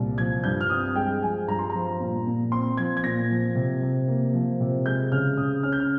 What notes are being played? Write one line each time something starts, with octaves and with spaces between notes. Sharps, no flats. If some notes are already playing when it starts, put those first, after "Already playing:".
Already playing: C2 A#2
F3 G#6
G2 G6
F6
C4 D#6
G#3 G5
F3 G#5
G2 A#5
C6
F3 A#5
A#2
A#2
C4 C6
F3 G#6
G#6
A#2 A#6
F3
C3
C3
A#3
F3
C3
G#3 G6
C#3 F6
C#3 D#6
C#4 F6
G6
F6